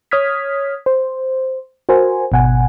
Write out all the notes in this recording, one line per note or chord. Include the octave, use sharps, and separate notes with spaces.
C#5 D#6 F6 G#6 B6
C5
F#4 A#4 C5 G#5
G#1 B2 F#5 G#5